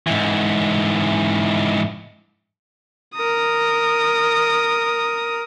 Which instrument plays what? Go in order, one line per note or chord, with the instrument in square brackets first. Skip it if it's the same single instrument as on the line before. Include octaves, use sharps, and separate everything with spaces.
[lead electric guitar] G#2 E3
[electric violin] A#4 D#6